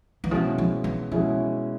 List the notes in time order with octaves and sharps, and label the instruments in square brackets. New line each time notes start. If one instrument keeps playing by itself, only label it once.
[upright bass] E3
[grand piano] B2 G#3 C#4 E4 [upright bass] F3
[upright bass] F3
E3
[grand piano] B2 G#3 C#4 E4 [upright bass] F3